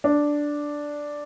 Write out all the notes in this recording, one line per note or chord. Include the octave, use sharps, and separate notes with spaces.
D4